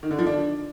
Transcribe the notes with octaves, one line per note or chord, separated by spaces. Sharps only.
D#3
D3
F3
D4